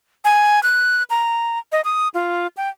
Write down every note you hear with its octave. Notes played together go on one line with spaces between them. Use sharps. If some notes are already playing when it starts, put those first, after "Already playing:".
G#5
F#6
A#5
D#5
D#6
F4
G5